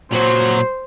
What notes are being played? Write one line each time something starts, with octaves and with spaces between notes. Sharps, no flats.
A#2 F#3 F#4 C5